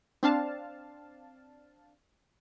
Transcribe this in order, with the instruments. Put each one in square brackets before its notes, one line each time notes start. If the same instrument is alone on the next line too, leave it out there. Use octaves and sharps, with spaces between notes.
[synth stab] C4 D4 F5 A5